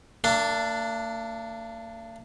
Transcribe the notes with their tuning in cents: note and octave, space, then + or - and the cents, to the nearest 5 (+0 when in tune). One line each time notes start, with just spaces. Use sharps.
A#3 -45 D4 +0